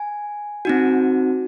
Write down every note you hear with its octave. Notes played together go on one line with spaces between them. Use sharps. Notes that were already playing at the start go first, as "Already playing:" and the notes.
Already playing: G#5
C4 D#4 F#4